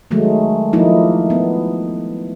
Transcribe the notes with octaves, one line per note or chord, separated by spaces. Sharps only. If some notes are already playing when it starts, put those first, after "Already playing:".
D#3 F#3 G#3 A3
F3 A3 A#3 D#4 E4
B3